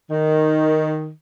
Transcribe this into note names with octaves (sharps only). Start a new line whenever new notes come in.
D#3